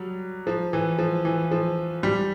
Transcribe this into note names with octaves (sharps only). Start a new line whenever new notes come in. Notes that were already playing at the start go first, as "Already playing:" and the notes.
Already playing: F#3 G3
F3
E3
F3
E3
F3
G3